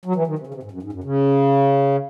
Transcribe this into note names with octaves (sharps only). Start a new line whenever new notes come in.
F#3
E3
D#3
C3
C#3
C3
G#2
F#2
G#2
F#2
C#3